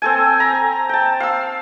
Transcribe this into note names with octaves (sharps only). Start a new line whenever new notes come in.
C4 A4 G#5
A#5
G5 A5
F5 E6